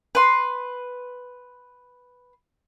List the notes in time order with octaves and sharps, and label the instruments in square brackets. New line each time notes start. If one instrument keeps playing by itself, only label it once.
[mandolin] B4 C6